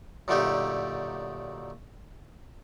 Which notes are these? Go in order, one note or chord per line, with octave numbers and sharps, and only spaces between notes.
F#2 A#2 D3 A3 D#4 G4